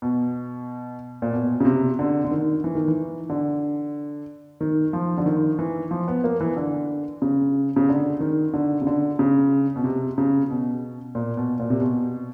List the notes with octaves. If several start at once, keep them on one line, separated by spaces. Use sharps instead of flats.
B2
A#2
B2
C#3
C3
D3
D3
D#3
E3
D#3
E3
D3
D#3
F3
D3
D#3
E3
F3
B3
A#3
E3
D3
C#3
C#3
D3
D#3
D3
C#3
D3
C#3
B2
C3
C#3
B2
A#2
B2
A#2
C3
B2